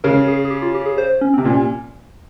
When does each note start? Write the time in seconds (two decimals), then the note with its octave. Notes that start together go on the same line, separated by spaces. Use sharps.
0.04 C#3 A#4
0.28 G#4
0.45 G#4
0.51 G4
0.62 F4
0.75 G4
0.86 G#4
0.98 C5
1.21 C#4
1.34 C3 C4
1.45 A#2 C#4